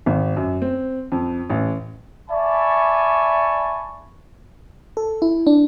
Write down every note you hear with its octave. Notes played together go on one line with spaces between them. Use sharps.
G#1
F#2
C4
F2
A1
D5 E5 G#5 A5 B5 C#6
A4
E4
D4